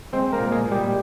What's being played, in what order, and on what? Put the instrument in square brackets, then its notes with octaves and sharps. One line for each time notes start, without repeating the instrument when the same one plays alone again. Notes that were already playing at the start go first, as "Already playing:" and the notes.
[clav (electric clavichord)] G#3 C4 C5
A#3 A#4
A#2
G#3 G#4
A#2
G3 G4